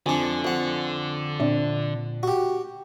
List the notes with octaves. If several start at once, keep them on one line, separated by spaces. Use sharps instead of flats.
F2 D3 D4 G#5
F2 F#5
A#2 C4 D4
F#4 G4